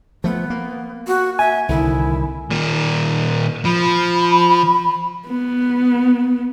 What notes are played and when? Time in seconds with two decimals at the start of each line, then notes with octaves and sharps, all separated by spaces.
0.24 F3 A3 B3
0.50 A#3
1.07 F#4
1.39 E5 G#5
1.69 C2 D3 D#3 E4
2.50 A#2 D#3
3.65 F3 B5
5.27 B3